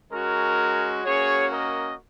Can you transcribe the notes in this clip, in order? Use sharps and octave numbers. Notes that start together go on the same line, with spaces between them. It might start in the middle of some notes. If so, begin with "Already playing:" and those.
G#3 C#4 F#4 A#4
A#3 C#4 F#4 G#4 C#5
A#4 D#5